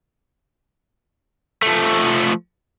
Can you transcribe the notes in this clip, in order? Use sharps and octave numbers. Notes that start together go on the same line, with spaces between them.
F3 A3